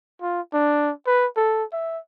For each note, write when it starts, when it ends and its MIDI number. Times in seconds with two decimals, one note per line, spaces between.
0.22 0.41 65
0.53 0.91 62
1.07 1.27 71
1.37 1.64 69
1.73 1.99 76